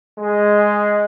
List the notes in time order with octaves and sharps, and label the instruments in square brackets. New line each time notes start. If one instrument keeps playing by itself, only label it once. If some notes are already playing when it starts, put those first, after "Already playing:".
[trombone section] G#3